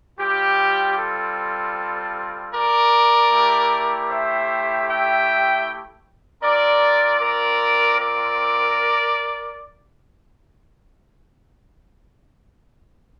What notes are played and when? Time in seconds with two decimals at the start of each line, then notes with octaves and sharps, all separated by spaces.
0.19 G3 C4 F4 G4
0.96 A4
2.53 A#4 D5
3.30 A3 E4 G4
4.08 C5 E5
4.87 E5 G5
6.43 C4 F4 A#4 D5
7.21 A#4 D5
7.98 A#4 D5